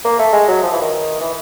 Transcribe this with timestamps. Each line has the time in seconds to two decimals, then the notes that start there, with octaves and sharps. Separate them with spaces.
0.05 A#3
0.19 A3
0.33 G#3
0.48 F#3
0.63 F3
0.72 E3
0.82 D#3
1.21 E3